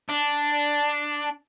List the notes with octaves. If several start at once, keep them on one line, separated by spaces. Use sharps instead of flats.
D4